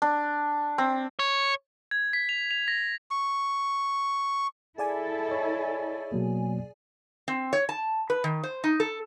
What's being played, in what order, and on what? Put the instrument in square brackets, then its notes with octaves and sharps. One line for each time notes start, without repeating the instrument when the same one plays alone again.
[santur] D4
C4
[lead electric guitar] C#5
[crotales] G#6
B6
F7
F7
A#6
[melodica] C#6
[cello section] E4 A4 [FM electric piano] G#4 D5 G#5
[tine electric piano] C#5 D#5
B2 F#3 A#3
[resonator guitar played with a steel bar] C4
C#5
A5
B4
D#3
C5
D#4
A4